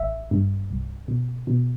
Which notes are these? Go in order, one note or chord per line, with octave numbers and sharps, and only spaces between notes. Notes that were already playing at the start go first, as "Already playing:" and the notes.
Already playing: A1 E5
G2
C2
B2
B2